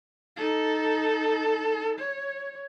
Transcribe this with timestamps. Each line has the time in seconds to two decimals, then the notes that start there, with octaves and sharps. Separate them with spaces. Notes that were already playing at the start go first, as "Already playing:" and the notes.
0.36 D#4 A4
1.99 C#5